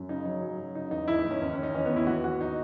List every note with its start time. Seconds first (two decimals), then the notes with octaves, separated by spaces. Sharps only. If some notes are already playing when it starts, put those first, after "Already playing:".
Already playing: F#2
0.09 C#3 D#4
0.25 F#3
0.42 F#3
0.59 F#3
0.75 C#3 D#4
0.91 E2 D#4
1.08 E2 E4
1.19 D#4
1.25 E2
1.31 C#4
1.41 D#2 C#4
1.53 D#2 C#4
1.63 D#4
1.74 E3 C#4
1.85 B3
1.91 D#2
1.96 E4
2.07 E3 F#4
2.24 E3 F#4
2.41 D#4